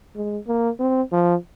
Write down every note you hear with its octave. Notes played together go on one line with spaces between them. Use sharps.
G#3
A#3
C4
F3